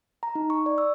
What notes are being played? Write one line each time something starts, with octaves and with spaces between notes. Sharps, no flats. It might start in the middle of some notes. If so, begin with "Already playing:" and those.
A#5
D#4
C#6
D5
E6